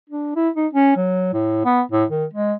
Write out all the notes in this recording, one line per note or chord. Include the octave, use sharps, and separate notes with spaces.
D4
E4
D#4
C#4
F#3
A2
B3
A2
D#3
G#3